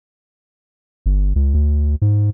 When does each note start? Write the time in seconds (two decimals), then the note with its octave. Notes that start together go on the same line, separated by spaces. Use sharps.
1.06 G1
1.36 C#2
1.54 D2
2.02 G#2